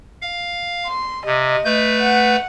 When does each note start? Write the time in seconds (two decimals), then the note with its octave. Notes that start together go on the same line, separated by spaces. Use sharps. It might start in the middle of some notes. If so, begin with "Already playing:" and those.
0.22 F5
0.87 C6
1.26 C3 D#5
1.65 A3 B4 G6
2.01 F#5